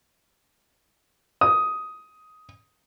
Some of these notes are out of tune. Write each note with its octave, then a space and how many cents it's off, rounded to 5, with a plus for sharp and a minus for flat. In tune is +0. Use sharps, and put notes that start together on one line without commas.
D#6 +10